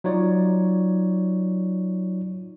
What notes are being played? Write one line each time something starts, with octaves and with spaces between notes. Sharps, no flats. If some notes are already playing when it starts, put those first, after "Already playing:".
F#3 D#4 F4 C#5 D5